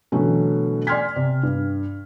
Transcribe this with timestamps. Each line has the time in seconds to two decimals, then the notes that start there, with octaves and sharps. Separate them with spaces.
0.12 B2 D3 E3 F#3 A3 C#4
0.87 D5 G#5 C6 F6 G#6 B6
1.16 C3 D5
1.43 G2